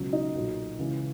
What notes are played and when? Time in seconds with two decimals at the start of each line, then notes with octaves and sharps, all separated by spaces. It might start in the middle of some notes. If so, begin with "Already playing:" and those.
Already playing: C#2 B2 F#3
0.13 D#4
0.35 B1 A#2 F#3
0.79 C#2 C#3 E3